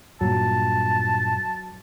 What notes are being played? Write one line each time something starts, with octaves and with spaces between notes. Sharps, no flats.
G2 A#2 F#3 A5